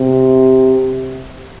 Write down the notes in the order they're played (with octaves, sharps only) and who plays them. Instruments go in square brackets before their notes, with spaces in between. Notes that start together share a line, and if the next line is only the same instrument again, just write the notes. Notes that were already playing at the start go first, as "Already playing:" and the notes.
Already playing: [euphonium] C3